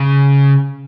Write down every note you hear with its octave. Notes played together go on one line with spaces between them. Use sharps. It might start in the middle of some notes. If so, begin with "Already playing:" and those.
Already playing: C#3